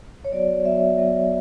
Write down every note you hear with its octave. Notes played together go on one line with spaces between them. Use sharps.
C#5
F#3 B3 F#4 D5
F#3 B3 F#4 E5
F#3 B3 F#4